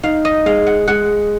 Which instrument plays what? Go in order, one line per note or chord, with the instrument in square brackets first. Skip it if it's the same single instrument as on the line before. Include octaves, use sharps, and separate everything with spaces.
[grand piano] D#4 [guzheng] F5
[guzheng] D#5
[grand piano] G#3 [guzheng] F5
[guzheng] F#5
[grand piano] G#3 [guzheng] F#5